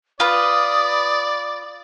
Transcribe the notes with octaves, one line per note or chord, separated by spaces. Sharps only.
F4 B4 D5 D#6